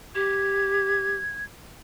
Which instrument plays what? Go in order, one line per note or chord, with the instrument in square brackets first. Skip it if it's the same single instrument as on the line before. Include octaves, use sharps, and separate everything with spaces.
[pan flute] G4 [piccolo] G#6